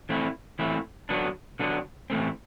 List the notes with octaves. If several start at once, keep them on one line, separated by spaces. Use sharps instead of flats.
E3 A3 C4 E4
E3 A3 C4 E4
D3 F#3 B3 D4
D3 F#3 B3 D4
A2 E3 A3 C4